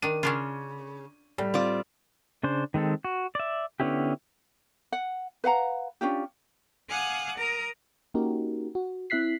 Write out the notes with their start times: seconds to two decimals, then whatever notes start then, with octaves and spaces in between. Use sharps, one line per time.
0.02 D#3 D4 D#7
0.23 C#3 C#4 D4 F4
1.38 A2 G3
1.54 C4 F4 D5
2.43 C#3 D4 C5
2.74 D#3 G#3 C4 A4
3.04 F#4
3.35 D5 E5
3.80 D3 B3 C#4 E4 G4
4.92 F#5
5.44 B4 F5 F#5 A#5
6.01 C#4 D4 F4 G4
6.89 F5 F#5 G#5 D6 D#6 F#6
7.37 A#4 A#5 D#6
8.14 A#3 C#4 D#4 F#4 G4 A#4
8.75 F#4
9.10 C4 E4 E5 F#6 B6 C7